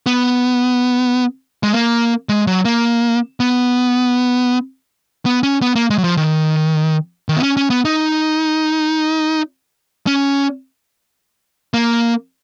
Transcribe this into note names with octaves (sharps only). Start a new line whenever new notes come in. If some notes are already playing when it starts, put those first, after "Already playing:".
B3
G#3
A#3
G#3
F#3
A#3
B3
B3
C#4
B3
A#3
G#3
F#3
F3
D#3
D#3
B3
C#4
C#4
B3
D#4
C#4
A#3